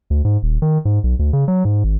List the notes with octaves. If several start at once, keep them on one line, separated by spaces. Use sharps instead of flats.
D2
G#2
D#1
D#3
G#2
B1
D2
C#3
F#3
G#2
G#1